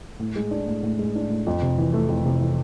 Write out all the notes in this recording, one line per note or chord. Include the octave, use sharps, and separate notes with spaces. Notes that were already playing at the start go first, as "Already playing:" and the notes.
A2
G#3
D4
A2
A2
G#3
D4
A2
F2
C3
E3
A3
F2
C3
E3